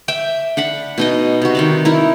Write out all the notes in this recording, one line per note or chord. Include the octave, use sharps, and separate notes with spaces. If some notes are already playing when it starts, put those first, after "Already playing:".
E5 G5 D6
D4 F#5 B5
B2 D#4 D#5
C3 F#4
D#3 C4 D5
D#4 E4 A#4